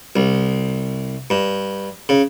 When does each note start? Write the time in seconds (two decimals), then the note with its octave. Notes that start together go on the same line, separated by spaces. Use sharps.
0.16 C2
1.30 G2
2.09 C#3